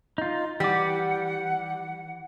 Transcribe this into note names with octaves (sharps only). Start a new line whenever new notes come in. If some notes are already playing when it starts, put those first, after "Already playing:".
D#4 F4
E3 G3 G4 F#5 D6